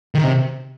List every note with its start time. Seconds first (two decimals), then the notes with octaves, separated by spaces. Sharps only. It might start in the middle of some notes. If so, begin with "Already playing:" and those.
0.15 D#3
0.23 C3